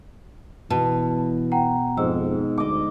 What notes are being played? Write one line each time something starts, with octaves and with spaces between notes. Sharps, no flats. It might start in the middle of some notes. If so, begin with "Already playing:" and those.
B2 E3 B4 A5
F#5 G5 A#5
F2 G#2 E6
D2 D#5 D6